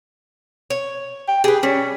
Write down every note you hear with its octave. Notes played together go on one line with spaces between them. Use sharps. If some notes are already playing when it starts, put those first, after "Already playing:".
C#5
G5
G4 G#4 B4
G3 C#4